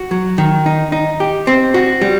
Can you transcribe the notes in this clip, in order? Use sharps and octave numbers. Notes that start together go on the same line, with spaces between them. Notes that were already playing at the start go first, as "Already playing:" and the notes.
Already playing: F#4
F#3
D#3
D#4
D#4
G4
C4
F#4
G3